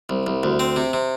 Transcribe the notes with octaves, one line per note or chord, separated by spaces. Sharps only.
C2
C2
D2
C4
C3
C3